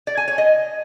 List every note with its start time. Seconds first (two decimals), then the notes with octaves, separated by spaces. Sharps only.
0.07 D5
0.17 G#5
0.28 C#5
0.38 D#5